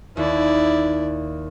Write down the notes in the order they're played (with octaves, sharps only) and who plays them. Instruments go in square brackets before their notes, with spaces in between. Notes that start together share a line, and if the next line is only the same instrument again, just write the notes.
[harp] D#2 [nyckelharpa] E4 D5